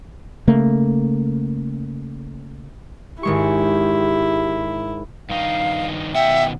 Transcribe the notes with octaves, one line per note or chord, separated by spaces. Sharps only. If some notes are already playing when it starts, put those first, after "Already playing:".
C#3 A3 A#3
G#1 G#3 E4 G4 C#6
G2 D#3 D#4 F5
B2 D#3 E5 F#5 G5